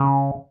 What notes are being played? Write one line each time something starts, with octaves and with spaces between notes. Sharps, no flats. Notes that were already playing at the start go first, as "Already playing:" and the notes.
Already playing: C#3